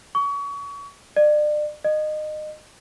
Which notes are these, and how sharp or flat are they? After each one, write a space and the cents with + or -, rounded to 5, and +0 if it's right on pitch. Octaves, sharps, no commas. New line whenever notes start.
C#6 +30
D5 +35
D#5 -25